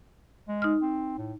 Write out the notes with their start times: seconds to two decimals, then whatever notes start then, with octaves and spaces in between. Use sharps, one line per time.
0.48 G#3
0.62 D#4 F6
0.82 C4
1.18 A2